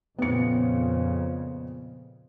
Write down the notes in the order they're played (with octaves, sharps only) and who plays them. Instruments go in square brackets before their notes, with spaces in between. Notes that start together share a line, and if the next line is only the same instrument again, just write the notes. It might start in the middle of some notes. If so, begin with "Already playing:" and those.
[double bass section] F2 A#2 C#3 [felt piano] B3 C#7